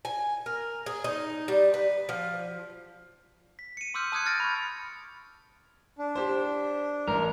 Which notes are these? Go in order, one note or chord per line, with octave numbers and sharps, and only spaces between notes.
G#5
A#4
G#4
D#4
G3
B4
F3
B6
C#7 D#7
C6 D6 E6 F6 G6 C#7
A5 D#6 F#6 G#6 C#7
F6 A6 A#6 D7
B5 C#6
D4
G4 C5
A1 A#4